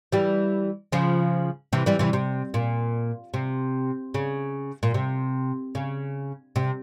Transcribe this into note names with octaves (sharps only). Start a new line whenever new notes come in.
E3 G3
C#3 F3
C3 E3
E3 G3
C3 E3
C3
A#2
C3
C#3
A#2
C3
C#3
C3